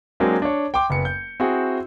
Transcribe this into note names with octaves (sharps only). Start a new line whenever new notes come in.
F#3 G#3 A#3 C4 D4
D4 C#5
G5 C6 D6
F#1 B3 C#7
G6
C4 E4 F#4 G#4